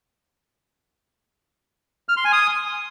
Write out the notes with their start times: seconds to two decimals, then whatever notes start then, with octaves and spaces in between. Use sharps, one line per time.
2.09 F6
2.17 C6
2.25 G#5
2.33 D#6